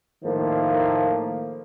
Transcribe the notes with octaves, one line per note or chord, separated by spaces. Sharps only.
A2 D#3 F3 A#3